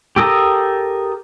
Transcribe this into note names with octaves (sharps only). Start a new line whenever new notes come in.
G4 A4 A#4 D#6